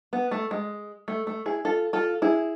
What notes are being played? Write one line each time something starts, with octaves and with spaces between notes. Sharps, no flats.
B3
A3
G#3
A3
A3
E4 G#4
F4 A4
F4 A4
E4 G#4